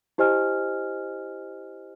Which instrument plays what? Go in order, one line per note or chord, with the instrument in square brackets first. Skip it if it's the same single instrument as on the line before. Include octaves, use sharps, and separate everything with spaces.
[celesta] E4 G4 C5 D#5 G#5 F6